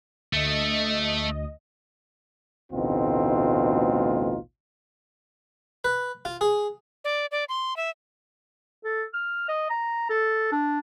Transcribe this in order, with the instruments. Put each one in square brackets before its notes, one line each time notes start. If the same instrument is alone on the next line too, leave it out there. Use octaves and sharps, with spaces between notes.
[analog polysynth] D2 D#5 [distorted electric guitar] A3
[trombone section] A1 D2 B2 C4 D#4 F4
[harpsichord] B4
F4
G#4
[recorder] D5
D5
C6
E5
[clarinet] A4
F6
D#5
A#5
A4
D4